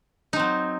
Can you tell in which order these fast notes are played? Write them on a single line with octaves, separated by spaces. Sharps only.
D#4 C4 F#3